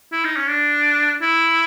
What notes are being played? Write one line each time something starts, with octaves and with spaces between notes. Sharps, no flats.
E4
D#4
C#4
D4
E4